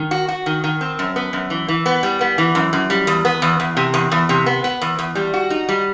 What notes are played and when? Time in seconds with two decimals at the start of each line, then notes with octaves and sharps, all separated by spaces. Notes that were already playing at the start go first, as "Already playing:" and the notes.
Already playing: D#3
0.11 F#4
0.28 F#4
0.46 D#3
0.64 D#3
0.81 C4
0.99 F#2
1.16 B3
1.33 F#2
1.50 E3
1.68 E3
1.86 B3
2.03 G3
2.21 B3
2.38 E3
2.55 F#2
2.73 F#2
2.90 G3
3.07 E2
3.25 B3
3.42 E2
3.60 E2
3.77 C3
3.94 E2
4.11 E2
4.29 C3
4.46 B3
4.64 B3
4.82 E2
4.99 E2
5.15 G3
5.34 F#4
5.50 D#4
5.69 G3